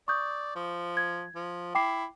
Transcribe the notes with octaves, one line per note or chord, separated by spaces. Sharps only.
D5 C#6 D#6 G6
F3
G#6
F3
E4 G5 D6 C7